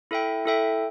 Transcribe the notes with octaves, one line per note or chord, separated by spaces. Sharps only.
E4 A4 E5 G5
E4 A4 E5 G5